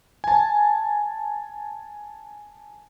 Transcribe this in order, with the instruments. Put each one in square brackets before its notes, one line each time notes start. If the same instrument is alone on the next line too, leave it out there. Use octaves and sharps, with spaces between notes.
[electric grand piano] G#5 A5